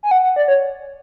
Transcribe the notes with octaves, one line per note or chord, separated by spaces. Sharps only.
G#5
F#5
F#5
D5
C#5